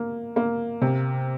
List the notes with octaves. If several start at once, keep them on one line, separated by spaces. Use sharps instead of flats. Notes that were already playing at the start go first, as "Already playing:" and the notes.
Already playing: A#3
A#3
C3